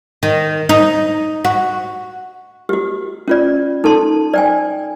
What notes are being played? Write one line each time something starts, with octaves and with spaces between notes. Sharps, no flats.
D#3
D#4
F#4
F#4 G4
C#4 F4 D5
D#4 A4 A5 C6
D5 G5 G#5